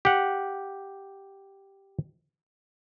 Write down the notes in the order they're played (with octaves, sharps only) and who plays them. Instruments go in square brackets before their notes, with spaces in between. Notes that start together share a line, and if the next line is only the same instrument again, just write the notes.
[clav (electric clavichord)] G4 F#5